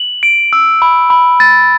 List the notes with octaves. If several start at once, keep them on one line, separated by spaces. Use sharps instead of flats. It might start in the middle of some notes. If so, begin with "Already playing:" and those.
Already playing: F#7
D7
E6
B5
B5
A6